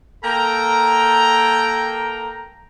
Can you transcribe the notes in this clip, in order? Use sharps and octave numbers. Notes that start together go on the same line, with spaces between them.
A#3 A4 G5 A#5